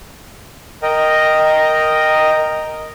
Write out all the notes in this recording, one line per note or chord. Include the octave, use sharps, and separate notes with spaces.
A#4 D#5 G5